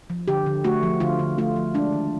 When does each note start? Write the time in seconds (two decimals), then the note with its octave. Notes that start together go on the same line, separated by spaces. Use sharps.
0.10 F3
0.28 D3 G4
0.46 D3
0.64 A3 F#4
0.83 F3
1.00 D3 F4
1.19 D3
1.38 A3 F4
1.56 F3
1.74 G#3 D4
1.93 D#3